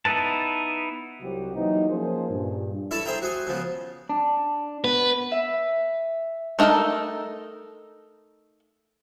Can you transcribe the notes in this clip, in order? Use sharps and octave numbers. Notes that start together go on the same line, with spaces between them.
B3 D#4 E4 B4 A5
C2 C3 F#3 C4 F#4 G4
E3 F#3 A#3 D#4
F3 A#3 C#4 G#4 C5
G2 A#2
E4 A4 C#5 E5 A5 B5
G#4 C5 E5 G5 A#5
F#4 G#4 G#5
C#3 F3 B3
D4
B3 B4
E5
A3 D#4 F#4 A4 A#4